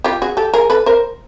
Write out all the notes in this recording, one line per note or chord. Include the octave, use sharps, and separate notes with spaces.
F4 G4
F#4 G#4
G4 A4
G#4 A#4
A4 B4
A#4 C5